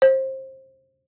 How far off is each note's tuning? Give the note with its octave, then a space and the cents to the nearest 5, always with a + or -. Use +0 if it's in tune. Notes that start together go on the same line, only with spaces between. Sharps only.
C5 +25